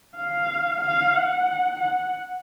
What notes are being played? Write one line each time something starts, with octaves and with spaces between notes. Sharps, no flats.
F5
F5
F#5
F#5